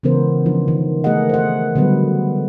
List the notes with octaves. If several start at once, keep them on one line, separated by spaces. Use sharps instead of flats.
C#3 E3 G#3 B3 A#4 C5
F3 D4
D#3
A3 G#4 A#4 D#5 F#5
C5 F#5
D3 F#3 G3 B3 B4